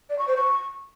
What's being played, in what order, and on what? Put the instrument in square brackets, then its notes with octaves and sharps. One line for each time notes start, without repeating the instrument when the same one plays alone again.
[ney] D5
C#6
C5
C#6